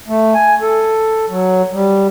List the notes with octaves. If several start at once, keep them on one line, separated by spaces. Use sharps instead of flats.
A3
G#5
A4
F#3
G3